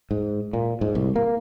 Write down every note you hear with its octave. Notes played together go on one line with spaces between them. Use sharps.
G#2
A#2
G#2
C2
A#3